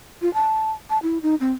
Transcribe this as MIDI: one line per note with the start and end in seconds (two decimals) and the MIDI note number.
0.22 0.32 65
0.34 0.71 81
0.90 0.98 81
1.03 1.18 64
1.23 1.35 63
1.40 1.52 60